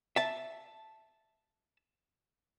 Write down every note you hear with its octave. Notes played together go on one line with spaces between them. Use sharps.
E5 A5